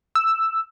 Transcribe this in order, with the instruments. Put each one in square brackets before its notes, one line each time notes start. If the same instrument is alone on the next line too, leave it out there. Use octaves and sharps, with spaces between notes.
[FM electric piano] E6